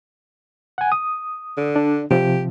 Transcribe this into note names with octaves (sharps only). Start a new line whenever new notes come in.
F#5 G#5
D#6
D3
D4
C3 F3 G4